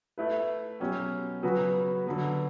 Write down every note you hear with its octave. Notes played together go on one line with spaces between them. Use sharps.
A3 E4 B4
B2 F#3 C#4 G4
C#3 F#3 B3 F#4 B4
D3 F#3 B3